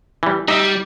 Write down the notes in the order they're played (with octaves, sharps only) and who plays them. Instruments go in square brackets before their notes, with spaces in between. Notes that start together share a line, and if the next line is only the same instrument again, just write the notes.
[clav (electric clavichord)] E3 G3
[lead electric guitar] G3 [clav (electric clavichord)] D#4 E5